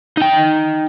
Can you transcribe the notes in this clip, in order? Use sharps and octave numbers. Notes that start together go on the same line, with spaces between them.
D#4 G5